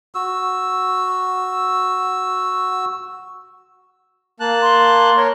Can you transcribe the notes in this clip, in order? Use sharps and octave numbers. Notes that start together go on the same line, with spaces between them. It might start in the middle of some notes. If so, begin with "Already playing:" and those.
F#4 E6
A#3 A5 F#6
C6
A#4 C#5